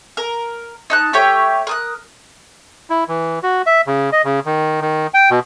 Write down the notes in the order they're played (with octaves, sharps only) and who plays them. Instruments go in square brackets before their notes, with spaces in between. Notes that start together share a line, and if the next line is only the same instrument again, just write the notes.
[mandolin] A#4
D#4 A5 F#6
A3 G4 C#5 G5
A#4 D#6 F#6
[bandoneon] E4
E3
F#4
E5
C#3
D#5
C#3
D#3
D#3
G5
B2